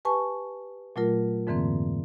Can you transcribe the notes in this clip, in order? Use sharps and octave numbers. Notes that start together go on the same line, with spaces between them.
G4 B4 G#5 A5 C#6
A#2 F#3 A3 F4 A#4
F2 G#2 D3 E3 A#3 C4